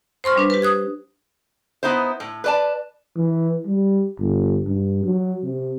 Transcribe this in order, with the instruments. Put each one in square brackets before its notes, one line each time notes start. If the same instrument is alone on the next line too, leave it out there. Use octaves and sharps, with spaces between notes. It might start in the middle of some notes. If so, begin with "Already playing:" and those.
[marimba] C5 C6 C#6 F6
G3 D4 B4
G4 B4
D#6 F#6 G#6
[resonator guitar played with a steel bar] B3 D#4 E4 C5
A2
B4 D5 A5
[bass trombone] E3
G3
G1
G2
F#3
C3